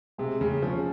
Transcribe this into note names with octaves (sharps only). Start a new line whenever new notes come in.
C3 G#3
C#3
F3 C#4